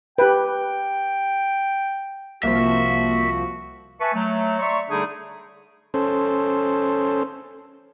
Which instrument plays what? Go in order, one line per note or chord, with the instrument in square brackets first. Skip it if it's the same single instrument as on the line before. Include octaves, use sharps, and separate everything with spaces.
[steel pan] G4 B4 [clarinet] G5
[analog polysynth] C2 F3 [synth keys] A#3 [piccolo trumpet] F#4 [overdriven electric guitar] E5
[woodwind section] B4 E5 G#5 A5 C#6
F#3 A3
C#5 D5 E5 A#5 C6 C#6
D3 G3 A3 D4 D#4 G#4
[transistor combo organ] C#4 A4 C5